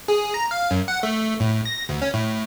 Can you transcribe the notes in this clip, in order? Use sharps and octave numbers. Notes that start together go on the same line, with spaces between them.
G#4
A#5
F5
F#2
F#5
A3
A2
A#6
D2
C#4
A2